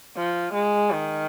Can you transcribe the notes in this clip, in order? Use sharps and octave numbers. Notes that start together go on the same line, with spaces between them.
F3
G#3
D#3